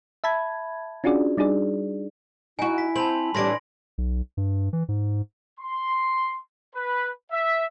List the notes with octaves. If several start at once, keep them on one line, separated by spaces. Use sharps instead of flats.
E5 A5 B5 G#6
C#4 D4 F4 F#4 G#4 D5
G3 D4 D#4 G#4 D5
D#4 E4 F#4 G#5
B6
C4 A5 B5 F#7
A2 E3 G3 D4 C6 A#6 D7
B1
G2
E3
G#2
C6
B4
E5